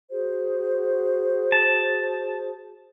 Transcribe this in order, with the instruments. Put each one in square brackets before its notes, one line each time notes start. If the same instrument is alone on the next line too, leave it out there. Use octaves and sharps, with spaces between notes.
[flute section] F#4 G#4 C5
[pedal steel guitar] A5